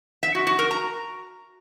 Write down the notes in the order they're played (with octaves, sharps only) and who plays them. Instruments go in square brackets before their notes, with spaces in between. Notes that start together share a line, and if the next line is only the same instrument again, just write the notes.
[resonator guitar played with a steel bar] E5
F#4
F#4
A#4
A#5